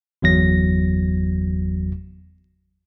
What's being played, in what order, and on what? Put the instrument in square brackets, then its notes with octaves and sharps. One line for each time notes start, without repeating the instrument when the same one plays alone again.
[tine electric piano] G1 E2 F#3 A#6